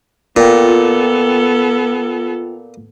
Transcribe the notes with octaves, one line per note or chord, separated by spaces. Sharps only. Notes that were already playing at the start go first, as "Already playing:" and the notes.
A#2 B3 F4 A4 G5